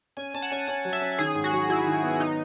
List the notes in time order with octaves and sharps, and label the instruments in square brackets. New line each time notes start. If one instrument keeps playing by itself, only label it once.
[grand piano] C#4 [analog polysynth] G#5
[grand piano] C#4 [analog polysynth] A5
[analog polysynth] F#5
[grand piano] C#4 [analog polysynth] G#5
[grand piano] C#4 [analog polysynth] F#5
[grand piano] F#3
[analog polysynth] E5
[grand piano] C#4
[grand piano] D#3 [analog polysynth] G#4
[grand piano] G#2
[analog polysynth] F#4
[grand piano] F#3
[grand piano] F#3 [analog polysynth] E4
[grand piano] D#3
B3
[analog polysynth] D#4